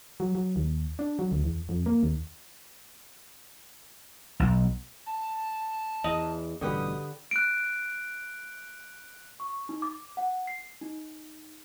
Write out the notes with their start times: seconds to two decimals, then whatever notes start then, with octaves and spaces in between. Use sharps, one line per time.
0.20 F#3
0.35 F#3
0.56 D#2
0.99 D4
1.19 F#3
1.31 D2
1.44 E2
1.69 F2
1.86 A#3
2.03 D#2
4.40 B1
5.06 A5
6.04 E2 D#5
6.61 A1 G2 B2 D3 G4 B4 D#6
7.31 F#6 D7
9.40 C#6
9.69 D#4
9.82 D6
10.17 F#5
10.47 C7
10.81 D#4